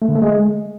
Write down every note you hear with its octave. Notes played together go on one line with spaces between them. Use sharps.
A3
D3
A3
G#3